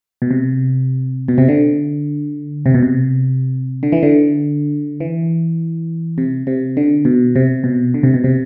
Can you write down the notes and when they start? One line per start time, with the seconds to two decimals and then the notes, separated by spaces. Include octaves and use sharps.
0.22 B2
0.31 C3
1.28 B2
1.38 C3
1.48 D3
2.66 C3
2.74 B2
2.83 C3
3.83 D3
3.92 E3
4.03 D3
5.00 E3
6.18 C3
6.47 C3
6.77 D3
7.05 B2
7.36 C3
7.64 B2
7.94 D3
8.03 C3
8.14 B2
8.24 C3